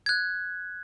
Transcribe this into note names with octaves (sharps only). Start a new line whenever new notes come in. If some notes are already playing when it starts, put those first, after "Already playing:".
F#6 G#6